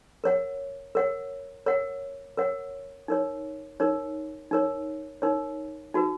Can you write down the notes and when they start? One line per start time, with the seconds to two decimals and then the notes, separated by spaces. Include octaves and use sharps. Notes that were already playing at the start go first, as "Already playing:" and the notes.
0.24 A#4 C#5 F#5
0.95 A#4 C#5 F#5
1.66 A#4 C#5 F#5
2.37 A#4 C#5 F#5
3.08 D#4 A#4 C#5
3.80 D#4 A#4 C#5
4.51 D#4 A#4 C#5
5.22 D#4 A#4 C#5
5.94 D#4 F#4 B4